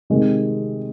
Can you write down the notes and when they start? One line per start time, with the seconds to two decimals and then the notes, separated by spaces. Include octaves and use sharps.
0.10 C3 D#3 G#3